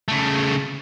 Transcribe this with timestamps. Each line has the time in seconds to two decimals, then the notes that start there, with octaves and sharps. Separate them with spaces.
0.08 C#3 A3